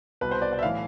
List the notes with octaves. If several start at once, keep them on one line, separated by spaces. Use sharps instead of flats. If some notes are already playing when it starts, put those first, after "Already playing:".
C2 B2 B4
C5
D5
D5
E5
B1 A2 E3 F5